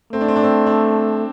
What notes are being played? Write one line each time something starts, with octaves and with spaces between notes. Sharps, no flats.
A3 C4
D4
C4
D4
C4
D4